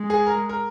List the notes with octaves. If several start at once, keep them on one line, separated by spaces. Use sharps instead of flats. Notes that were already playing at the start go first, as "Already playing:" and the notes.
Already playing: G#3
G#4
A#4
A#4